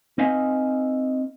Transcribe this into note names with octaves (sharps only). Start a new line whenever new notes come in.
C4 D#4 B4 D#5 F5 G#5